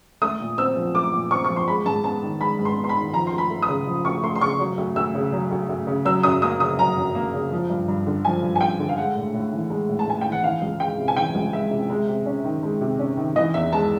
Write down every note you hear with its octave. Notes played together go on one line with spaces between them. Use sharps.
A3 D#6
A#2
C4 E6
F3
A3 D6
A#2
C4 C#6
F3 C#6
C6
G#3 B5
G#2 A5
B3 A5
D#3
G#3 B5
G#2
C6
B3
C6
B5
D#3
F3 A#5
C6
D2
B5
A3
D#6
C#3
F3
D2 C#6
A3 C6
C6
C#3 C#6
F#3
D2
D2 E6
C#3
F#3
D2
D2
C#3
F#3 E6
F#2 D#6
A#3 D#6
C#3 D#6
F#3 A#5
F#2
A#3
C#3
F3
G2
G2
D3
F3 G#5
G2
G#5
G2 G5
D3
F5
G#3 F#5
A2
A2
E3
G#3
A2
A5
A2 G#5
E3 G5
F#5
E3 F5
C#2
G#3 G5
C3
G#5
E3 G5
C#2
G#3 E5
C3
G#3
C3
C#4
D#3
G#3
C3
C#4
D#3
E3 D#5
E2 E5
G#3 A5